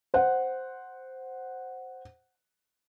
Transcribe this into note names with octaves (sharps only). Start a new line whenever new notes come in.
C5 F#5